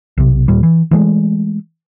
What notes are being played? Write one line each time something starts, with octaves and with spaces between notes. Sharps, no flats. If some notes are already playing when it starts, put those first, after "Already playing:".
B1 C3
D#2 A#2 G3
E3
E3 F#3 G#3 A3